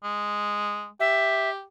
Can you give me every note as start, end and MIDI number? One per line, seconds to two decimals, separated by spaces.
0.04 0.89 56
1.00 1.64 67
1.00 1.50 76